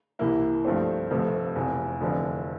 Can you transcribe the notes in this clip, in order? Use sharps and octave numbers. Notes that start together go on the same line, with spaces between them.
C2 C3 E3 A#3 E4
G2 F3 A3 C4
F1 F2 C3 F3 A3
F1 E2 C3
F1 E2 D3 F3